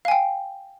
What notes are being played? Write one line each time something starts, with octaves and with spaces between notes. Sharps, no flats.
F5 G5 G#5